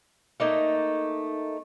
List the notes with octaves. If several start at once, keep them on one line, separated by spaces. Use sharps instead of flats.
A3 A#3 D#4